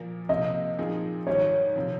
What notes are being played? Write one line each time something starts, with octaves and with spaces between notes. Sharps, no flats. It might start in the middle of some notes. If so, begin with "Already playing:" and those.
Already playing: A#2 F3 A#3
C3 F3 A#3 D#5
A#2 F3 C4 D#4 G#4
G#2 D#3 G3 C#5
C3 F3